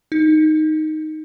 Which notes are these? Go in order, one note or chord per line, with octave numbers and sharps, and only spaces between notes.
D#4